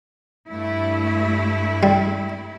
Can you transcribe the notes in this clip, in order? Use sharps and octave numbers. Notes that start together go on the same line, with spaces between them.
G2 A3 E4
G3